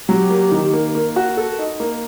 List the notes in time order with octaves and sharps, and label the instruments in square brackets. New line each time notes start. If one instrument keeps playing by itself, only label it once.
[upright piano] F#3 [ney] G4
[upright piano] A#3
D#3
A#3
A#3
F#4
A4
D#4
A#3